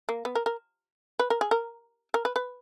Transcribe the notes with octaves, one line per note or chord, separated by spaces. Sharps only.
A#3
B3
A#4
A#4
B4
A#4
G#4
A#4
A#4
B4
B4